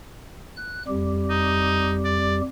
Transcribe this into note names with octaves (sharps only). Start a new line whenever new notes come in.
F#6
F2 G3 G4
D#4
D5